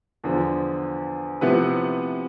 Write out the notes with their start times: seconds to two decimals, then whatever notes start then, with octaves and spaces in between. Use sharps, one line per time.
0.24 E2 D3 F3
1.41 C3 F3 B3 E4 B4